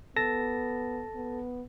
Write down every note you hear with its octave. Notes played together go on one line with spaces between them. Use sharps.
B3 A4 A5 A#6
B3